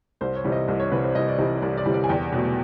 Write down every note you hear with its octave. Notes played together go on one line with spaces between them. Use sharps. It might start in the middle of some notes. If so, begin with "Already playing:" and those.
C2 C5
C#5
C3 E3 G3
D#5
C2 D#5
C#5
C3 E3 G3 B4
C5
C2 D#5
D5
C3 E3 G3 D#5
C2 D5
D5
C3 E3 G3
D5
G#5
E2 G5
B2 F#3 A3